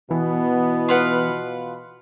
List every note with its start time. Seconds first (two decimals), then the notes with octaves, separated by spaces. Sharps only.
0.11 B2 E3 B3
0.89 F4 B4 F#5